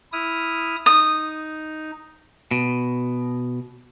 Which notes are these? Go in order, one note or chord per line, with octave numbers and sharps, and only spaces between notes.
E4 D#6 F6
D#4 D#6
B2